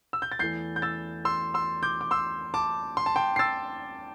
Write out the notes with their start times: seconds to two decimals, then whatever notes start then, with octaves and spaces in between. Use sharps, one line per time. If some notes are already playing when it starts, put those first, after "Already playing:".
0.13 E6
0.22 G6
0.32 A6
0.39 E2 E3 A3 G6 C7
0.76 G6
0.82 E6 A6
1.25 C6 E6
1.54 C6 E6
1.83 D6 G6
2.01 D6
2.11 C6 E6
2.54 A5 D6
2.97 C6
3.06 A5
3.16 G5 C6
3.36 C7
3.39 E6 A6